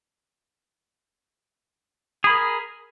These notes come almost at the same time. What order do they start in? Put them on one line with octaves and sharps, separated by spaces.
G#4 B5 A#4